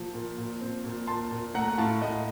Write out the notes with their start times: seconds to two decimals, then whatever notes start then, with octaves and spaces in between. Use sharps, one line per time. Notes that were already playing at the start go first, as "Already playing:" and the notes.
Already playing: A#2 F3 A5
0.14 A#2
0.38 A#2
0.61 C4
0.84 A#2
1.07 A#2 A5 C6
1.32 A#2
1.54 A3 F#5 A#5
1.68 F#5
1.78 A2 F5 A5
2.01 A2 D#5 F#5